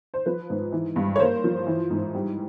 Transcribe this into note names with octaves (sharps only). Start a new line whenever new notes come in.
C5
F3 B4
G#2
E3
G2
C#5
A#3 C5
F3
E3
G#2
G3